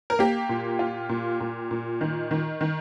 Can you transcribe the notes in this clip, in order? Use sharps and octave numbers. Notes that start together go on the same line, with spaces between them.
A#4
A#3 G4
A#2
F4
A#2
A#2
A#2
D#3
D#3
D#3